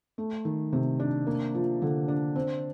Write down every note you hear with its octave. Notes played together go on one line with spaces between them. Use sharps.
A3
D#3
C3
D4
A#3
F3
D3
D4
C4